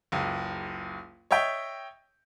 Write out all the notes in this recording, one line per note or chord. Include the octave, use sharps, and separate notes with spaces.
F#1 C#2
C#5 D#5 E5 G5